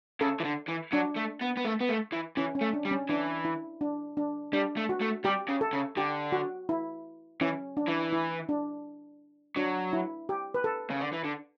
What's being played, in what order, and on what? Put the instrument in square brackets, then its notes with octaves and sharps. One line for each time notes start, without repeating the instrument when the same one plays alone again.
[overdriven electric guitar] C#3 [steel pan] A4
[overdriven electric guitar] E3
D3
E3
[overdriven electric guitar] F#3 [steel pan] D4
[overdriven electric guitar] A3
B3
B3
A3
B3
A3
E3
[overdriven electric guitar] E3 [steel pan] C#4
[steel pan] C#4
[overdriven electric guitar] A3
[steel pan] D4
[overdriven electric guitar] G3
[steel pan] C#4
[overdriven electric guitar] E3 [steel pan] D4
[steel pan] E4
D4
D4
[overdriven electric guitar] G3 [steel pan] D4
[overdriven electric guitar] A3
[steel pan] F#4
[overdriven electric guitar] A3
[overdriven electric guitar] G3 [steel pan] G4
[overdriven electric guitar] C#3
[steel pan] A4
[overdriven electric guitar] C#3
[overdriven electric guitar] D3 [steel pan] G4
[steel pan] F#4
E4
[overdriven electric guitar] E3 [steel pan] C#4
[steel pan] D4
[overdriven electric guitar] E3
[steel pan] E4
D4
[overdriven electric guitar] F#3 [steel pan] D4
[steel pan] E4
G4
B4
A4
[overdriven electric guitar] C#3
D3
E3
D3